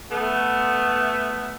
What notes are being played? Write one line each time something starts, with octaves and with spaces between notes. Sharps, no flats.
A3 B3